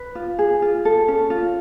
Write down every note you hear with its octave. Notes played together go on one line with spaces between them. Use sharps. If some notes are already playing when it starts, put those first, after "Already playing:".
Already playing: B4
F4
G#4
F4
A4
C#4
F4